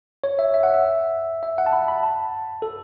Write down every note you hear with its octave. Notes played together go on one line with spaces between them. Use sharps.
C#5
E5
E5
F#5
E5
E5
F#5
A5
B5
B5
A5
A4